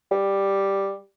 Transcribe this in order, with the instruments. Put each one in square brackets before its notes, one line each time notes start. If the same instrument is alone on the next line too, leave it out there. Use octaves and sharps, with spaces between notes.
[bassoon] G3